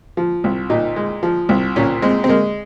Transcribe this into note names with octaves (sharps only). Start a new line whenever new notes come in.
F3
C2
A#2 D#4
G#3
F3
C2
A#2 C#4
G#3 C4
C4
G#3 A#3